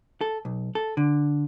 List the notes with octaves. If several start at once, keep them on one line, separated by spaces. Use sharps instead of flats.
A4
B1
A4
D3